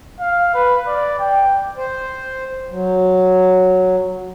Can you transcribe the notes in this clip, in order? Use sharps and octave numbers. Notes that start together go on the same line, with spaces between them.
F5
B4
D5
G5
C5
F#3